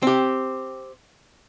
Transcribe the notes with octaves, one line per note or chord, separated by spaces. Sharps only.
C4 G4